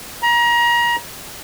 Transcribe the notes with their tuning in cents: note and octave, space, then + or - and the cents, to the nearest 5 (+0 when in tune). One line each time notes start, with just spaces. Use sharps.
A#5 +30